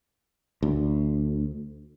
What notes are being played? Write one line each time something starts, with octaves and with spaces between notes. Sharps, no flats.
D2